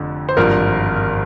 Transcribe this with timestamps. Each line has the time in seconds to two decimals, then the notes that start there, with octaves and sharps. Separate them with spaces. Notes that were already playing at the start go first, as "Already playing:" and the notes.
Already playing: F1 F2 D3
0.29 C5
0.37 G#1 G2 F3 A#4